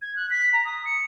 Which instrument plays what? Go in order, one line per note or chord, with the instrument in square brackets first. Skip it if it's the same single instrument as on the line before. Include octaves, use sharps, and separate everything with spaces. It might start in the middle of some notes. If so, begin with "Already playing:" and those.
[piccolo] G#6
F#6
B6
A#5
D#6
C#7